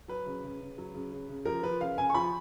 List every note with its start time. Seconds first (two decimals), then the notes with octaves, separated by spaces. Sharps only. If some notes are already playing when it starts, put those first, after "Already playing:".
0.08 F#3 B4
0.26 C#3
0.44 C#3
0.61 C#3
0.78 F#3
0.94 C#3
1.12 C#3
1.29 C#3
1.45 F3 A#4
1.63 F3 B4
1.81 C#3 F5
1.98 C#3 G#5
2.10 C#6
2.15 F3 B5